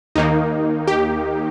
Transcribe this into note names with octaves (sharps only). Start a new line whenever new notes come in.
D#2 D#3 A#3 D#4
G4